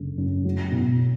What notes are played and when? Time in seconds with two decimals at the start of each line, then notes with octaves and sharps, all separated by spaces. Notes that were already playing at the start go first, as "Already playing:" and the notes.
Already playing: F#1 D3
0.18 F#2
0.45 F#3
0.72 B2